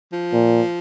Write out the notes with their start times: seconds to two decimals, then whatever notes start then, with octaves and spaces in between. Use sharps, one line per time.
0.12 F3
0.33 A#2